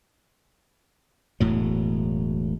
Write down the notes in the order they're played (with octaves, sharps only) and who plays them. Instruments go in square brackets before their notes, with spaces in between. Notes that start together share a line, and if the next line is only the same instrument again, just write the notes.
[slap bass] E1 A2 F#3